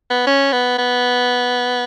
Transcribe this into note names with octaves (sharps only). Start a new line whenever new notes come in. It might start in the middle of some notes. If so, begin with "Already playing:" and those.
B3
C#4
B3
B3